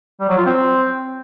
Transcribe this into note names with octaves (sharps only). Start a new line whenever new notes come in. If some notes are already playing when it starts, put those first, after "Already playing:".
G3
F#3
F4
C4